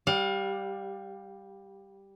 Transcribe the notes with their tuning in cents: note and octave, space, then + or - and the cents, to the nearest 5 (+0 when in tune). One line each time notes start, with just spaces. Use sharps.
G3 +0 F5 +35